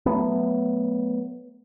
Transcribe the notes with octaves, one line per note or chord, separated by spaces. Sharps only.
F#3 A3 B3